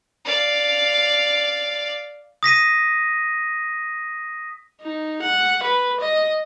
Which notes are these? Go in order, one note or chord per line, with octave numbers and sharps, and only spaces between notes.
D5 F5
D#6 A#6 B6 D#7
D#4
F#5
B4
D#5